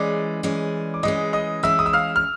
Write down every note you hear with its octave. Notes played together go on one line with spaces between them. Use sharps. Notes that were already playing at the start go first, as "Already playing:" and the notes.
Already playing: E3 G#3 C#4 D5 D6
E3 G#3 C#4
D6
E3 G#3 C#4 D#5 D#6
D#5 D#6
E3 G#3 C#4 E5 E6
D#6
E6
F5 F6
F6